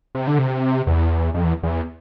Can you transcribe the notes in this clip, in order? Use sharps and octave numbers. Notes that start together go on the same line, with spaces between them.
C3
D3
C3
E2
F2
E2
E2